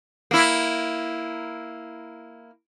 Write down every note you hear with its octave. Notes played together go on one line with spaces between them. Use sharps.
A#3 E4